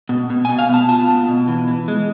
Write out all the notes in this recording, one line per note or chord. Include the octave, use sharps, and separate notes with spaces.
B2
B2
G#5
B2
F5
B3 A5
F4 A5
B3
B2
E3
E3
G#3